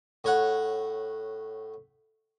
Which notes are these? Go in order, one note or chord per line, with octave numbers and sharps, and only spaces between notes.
A2 C#5 F#5